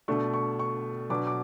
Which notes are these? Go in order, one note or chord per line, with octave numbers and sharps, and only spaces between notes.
B2 A3 D4 C#6
C#6
C#6
B2 F#3 B3 D4 D6
D6